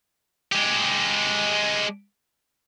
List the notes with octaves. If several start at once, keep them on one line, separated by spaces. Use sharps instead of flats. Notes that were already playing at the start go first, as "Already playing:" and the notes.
G#3 G4